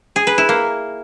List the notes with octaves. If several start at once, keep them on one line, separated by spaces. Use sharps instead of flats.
G#4
B4
E4
A#3